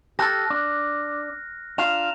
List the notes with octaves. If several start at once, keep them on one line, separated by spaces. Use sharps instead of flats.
G4 A4 F6 F#6 A#6
D4
D4 F4 F5 A#5 E7 F7